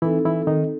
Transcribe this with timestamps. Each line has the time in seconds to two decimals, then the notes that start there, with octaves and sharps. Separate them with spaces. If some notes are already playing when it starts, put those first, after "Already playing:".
0.02 E3 C4 D#4 E4 A4
0.25 E3 E4
0.47 D#3 D#4